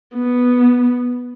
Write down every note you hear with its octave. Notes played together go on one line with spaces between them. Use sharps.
B3